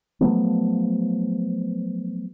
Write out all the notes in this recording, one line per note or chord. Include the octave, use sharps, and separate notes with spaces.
F3 F#3 A3 B3